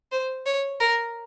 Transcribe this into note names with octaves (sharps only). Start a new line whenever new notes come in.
C5
C#5
A#4